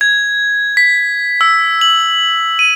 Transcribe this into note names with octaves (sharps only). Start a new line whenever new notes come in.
G#6
B6
E6
F#7
D#7